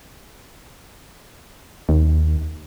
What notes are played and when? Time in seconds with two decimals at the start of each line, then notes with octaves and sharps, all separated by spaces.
1.89 D#2